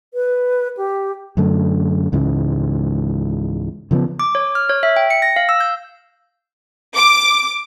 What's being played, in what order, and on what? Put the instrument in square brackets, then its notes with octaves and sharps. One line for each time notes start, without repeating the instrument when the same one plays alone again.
[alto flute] B4
G4
[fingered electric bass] F#2 D3 A3
C#2 G#2 C#3 E3
C#3 F3 G#3 B3
[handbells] D6
C#5
F6
C#5
E5
G5
C#7
A#6
F5
E6
G6
[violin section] D6